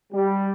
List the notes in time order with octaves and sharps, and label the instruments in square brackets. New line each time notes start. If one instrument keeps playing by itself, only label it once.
[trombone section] G3